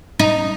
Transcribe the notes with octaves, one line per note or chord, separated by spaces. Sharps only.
D#4